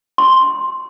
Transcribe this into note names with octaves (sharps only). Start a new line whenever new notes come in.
C6